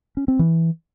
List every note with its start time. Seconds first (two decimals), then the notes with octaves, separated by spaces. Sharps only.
0.17 C#4
0.28 C4
0.39 E3